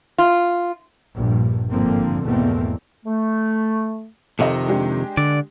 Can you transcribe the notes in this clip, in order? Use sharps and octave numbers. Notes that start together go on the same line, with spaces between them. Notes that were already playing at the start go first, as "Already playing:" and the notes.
F4
A#1 G2
G#1 D3 F3 A#3 C4
G#1 E2 B2 A3 A#3 C4
A3
F2 C3 D#3 A4 D#5
G#3 D4 G4
D3 D5